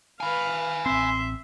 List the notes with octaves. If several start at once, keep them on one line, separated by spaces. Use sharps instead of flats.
B4 F5 G#5 B5
A1 C4 E5 C6